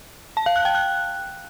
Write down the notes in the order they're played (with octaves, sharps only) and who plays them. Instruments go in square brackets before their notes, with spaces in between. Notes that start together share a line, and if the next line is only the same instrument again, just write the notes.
[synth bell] A5
F5
F#6
G5
F#6